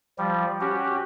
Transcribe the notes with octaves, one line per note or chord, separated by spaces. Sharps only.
F3 G3
C#4 F#4 G4